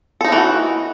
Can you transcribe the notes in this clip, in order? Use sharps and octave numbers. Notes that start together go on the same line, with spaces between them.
E3 F3 D#4 F#4 A4